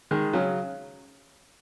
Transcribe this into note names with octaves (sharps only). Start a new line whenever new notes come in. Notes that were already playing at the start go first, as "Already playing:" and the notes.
D#3 G#3
C#3 F#3